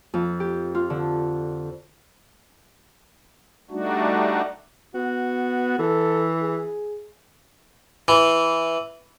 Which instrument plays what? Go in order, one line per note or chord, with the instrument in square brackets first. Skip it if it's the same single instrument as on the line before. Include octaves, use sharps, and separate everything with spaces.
[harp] F2
G4
F4
D3
[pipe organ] G3 A3 D4 D#4 F#4
[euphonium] B3 [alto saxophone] F#4
[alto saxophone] E3 [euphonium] A4
[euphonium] G#4
[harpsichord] E3